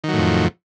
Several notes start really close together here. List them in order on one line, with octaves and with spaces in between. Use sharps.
D#3 F#3 A2 F2